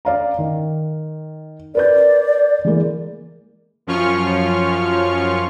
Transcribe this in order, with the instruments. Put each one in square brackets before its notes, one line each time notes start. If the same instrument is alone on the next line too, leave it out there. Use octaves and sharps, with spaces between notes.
[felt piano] D5 F5 A#5
D#3
[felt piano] A#4 B4 G6 [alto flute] D5
[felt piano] E3 G#3 A#3
[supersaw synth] F#2 F3 C#4 F4 C#6 F6